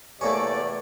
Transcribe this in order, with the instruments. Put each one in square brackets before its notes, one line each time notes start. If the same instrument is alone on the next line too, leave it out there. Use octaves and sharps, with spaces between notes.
[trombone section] E2 C3 [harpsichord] A3 A#3 C#4 [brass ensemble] D5